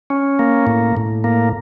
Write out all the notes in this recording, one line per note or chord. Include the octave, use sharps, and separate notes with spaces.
C#4
A#3
A2
A2
A#3